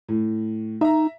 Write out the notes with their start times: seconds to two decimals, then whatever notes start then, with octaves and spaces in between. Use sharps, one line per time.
0.09 A2
0.81 D#4 E5 A#5